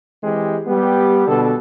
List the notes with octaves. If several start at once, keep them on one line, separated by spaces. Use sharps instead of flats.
E3 G#3 C4 G4
G3 B3 G4
B2 D3 A4